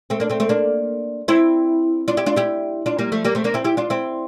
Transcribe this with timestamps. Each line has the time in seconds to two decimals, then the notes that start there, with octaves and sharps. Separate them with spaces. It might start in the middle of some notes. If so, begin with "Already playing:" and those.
0.10 A3 C4
0.20 A#3 D4
0.30 A3 C4
0.40 A3 C4
0.49 A#3 D4
1.28 C4 E4
2.08 D4 F4
2.17 E4 G4
2.26 D4 F4
2.36 E4 G4
2.86 D4 F4
2.99 G3 A#3
3.12 F3 A3
3.25 G3 A#3
3.35 A3 C4
3.44 A#3 D4
3.54 C4 E4
3.64 E4 G4
3.77 D4 F4
3.90 C4 E4